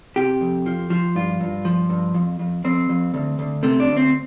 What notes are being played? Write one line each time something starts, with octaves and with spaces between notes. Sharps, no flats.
C3 G4
F2
F3
F3
G2 F4
G2
F3
G2
F2
F2
F2 C4
F2
D2
D2
C3 A3
D4
D2
C4